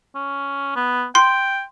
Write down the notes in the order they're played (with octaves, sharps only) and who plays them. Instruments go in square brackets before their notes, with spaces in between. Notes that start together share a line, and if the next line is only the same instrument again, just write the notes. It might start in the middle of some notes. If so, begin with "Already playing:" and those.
[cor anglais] C#4
B3
[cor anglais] G5 [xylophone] C6